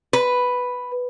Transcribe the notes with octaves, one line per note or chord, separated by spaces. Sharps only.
B4